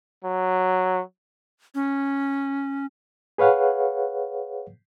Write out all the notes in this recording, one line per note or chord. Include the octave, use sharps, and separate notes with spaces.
F#3
C#4
G#4 B4 C#5 F5 F#5